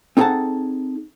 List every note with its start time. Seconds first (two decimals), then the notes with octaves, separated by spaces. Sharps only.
0.17 C4 D#4 G#4 A4 F#5 A5